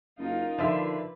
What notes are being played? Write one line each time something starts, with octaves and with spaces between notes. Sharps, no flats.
F#1 D#4 F4 A#4
D3 D#3 F3 F4 B4 E5